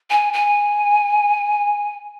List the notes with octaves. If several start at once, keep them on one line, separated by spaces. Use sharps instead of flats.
G#5
G#5